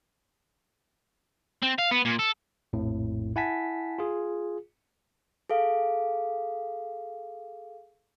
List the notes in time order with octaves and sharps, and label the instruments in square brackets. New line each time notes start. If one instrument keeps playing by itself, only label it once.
[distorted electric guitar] C4
F5
B3
A#2
A4
[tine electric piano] A#1 F2 A2
E4 F#5 G#5 A5 B6
F4 G#4
[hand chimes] G#4 A4 F5